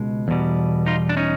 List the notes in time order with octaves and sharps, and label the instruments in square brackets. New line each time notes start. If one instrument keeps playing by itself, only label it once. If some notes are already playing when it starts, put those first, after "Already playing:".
Already playing: [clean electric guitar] C#2 B2 G#3
E2 B2 G3
D#4 F4
D4
C#4 D#4